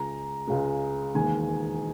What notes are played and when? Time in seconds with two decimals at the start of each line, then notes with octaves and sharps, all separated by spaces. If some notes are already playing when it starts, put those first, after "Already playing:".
Already playing: C#2 C#3 G#3 A#5
0.47 C#2 C#3 G#3
1.14 E1 D#2 D#3 G#3 G#5